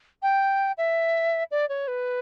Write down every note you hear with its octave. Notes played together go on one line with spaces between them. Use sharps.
G5
E5
D5
C#5
B4